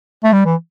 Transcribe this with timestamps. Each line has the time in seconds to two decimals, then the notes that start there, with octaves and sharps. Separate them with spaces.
0.24 A3
0.33 G3
0.46 E3